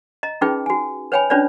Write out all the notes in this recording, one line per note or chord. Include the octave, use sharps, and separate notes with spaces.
D#5 A#5
C#4 D#4 F4 G#4 B4 G5
F#4 G#5
B4 C#5 G5 G#5 B5
C#4 D4 F4 B4 C#5 D5